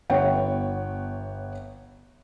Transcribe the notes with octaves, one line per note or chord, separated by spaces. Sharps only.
G1 B3 C#5 F#5 G5